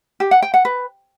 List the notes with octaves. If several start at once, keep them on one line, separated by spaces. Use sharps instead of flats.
G4
F#5
G5
F#5
B4